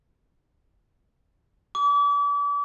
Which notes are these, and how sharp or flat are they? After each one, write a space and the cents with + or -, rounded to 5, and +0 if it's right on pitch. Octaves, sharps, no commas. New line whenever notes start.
D6 -40